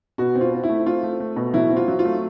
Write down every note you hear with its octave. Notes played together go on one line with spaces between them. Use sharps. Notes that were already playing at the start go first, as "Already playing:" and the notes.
B2 F#4
C4
F4
C4
E4
A3
C4 F4
A3
A3
B2
F#3 E4
C4
F4
F#3
F4
A3